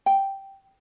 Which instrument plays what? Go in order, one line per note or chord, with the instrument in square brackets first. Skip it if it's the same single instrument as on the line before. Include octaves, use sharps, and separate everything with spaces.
[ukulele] G5